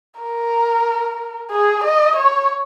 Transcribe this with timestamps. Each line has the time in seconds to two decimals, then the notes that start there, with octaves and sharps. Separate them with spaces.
0.20 A#4
1.51 G#4
1.84 D#5
2.17 C#5